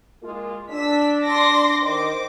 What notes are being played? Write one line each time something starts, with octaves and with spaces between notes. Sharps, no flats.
G#3 A#3 F4
D4 E6 B6
C6 D6 A#6
D#3 C5 D6